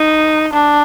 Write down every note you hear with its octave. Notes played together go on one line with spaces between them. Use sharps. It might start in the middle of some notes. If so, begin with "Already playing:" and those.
Already playing: D#4
D4